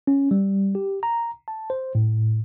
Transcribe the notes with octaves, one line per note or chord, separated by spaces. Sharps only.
C#4
G3
G4
A#5
A5
C5
A2